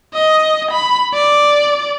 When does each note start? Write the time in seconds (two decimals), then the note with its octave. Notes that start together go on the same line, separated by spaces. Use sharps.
0.14 D#5
0.71 B5
1.14 D5